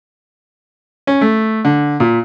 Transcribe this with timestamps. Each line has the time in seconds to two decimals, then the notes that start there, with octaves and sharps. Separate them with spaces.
1.07 C#4
1.21 A3
1.65 D3
2.00 A#2